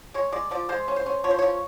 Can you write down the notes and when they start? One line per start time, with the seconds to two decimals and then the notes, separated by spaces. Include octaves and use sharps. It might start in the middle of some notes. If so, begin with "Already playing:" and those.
0.14 G#3 C#5
0.32 G#3 D5
0.51 F3 D5
0.69 G#3 C5
0.88 C#4
0.96 C5
1.06 C#4
1.24 F3 C#5
1.31 C5
1.39 F3 C#5